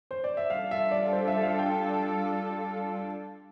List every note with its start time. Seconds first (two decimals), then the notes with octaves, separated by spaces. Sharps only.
0.11 C5
0.24 D5
0.37 E5
0.50 G3 D4 F4 A4 F5
0.71 E5
0.91 D5
1.13 C5
1.28 E5
1.43 F5
1.59 G5